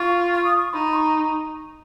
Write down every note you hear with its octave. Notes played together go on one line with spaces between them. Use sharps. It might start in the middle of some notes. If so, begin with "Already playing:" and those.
Already playing: F4 C#6
C#6
D#6
C#6
D#4 B5
C#6